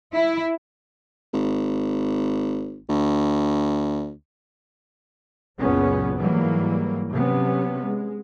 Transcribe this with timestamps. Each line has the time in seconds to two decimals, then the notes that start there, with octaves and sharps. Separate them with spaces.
0.13 E4
1.33 G#1
2.89 D2
5.58 F#1 C#2 F#2 A#2 B3 C#4
6.16 G#2 E3 F#3 G3 A#3
7.11 C3 F#3 B3 C#4
7.79 G#3